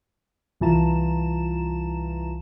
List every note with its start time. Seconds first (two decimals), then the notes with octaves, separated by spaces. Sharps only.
0.61 C2 E3 F4 A5 A#5 E7